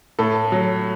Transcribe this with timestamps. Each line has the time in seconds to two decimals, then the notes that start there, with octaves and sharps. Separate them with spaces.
0.19 A2 A4
0.52 F#3